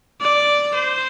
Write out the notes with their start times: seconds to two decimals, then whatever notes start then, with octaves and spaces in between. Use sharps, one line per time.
0.21 D5
0.75 C5